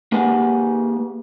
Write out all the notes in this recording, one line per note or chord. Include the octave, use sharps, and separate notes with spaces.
A#3 G4 G#4 B4 F#5 G#5